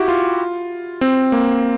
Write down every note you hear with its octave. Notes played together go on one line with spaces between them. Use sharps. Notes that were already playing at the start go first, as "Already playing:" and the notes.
Already playing: E4 F#4 G4
F4
C4
A#3